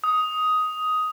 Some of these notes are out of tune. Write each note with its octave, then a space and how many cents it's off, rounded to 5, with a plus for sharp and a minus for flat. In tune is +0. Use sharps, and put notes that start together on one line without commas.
D#6 +10